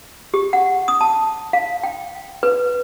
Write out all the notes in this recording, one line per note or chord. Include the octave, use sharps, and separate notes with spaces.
G4
F#5
D#6
A5
F5
G5
B4